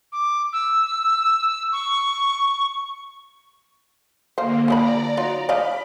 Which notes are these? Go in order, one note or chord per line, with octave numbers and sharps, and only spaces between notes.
D6
E6
C#6
D3 A#3 C5 F5
F3 D5 D#5 A#5 B5
F#3 D#4 F4
D5 D#5 F5 B5